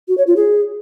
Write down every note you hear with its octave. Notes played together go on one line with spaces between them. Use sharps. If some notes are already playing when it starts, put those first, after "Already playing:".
F#4
C#5
F4
G#4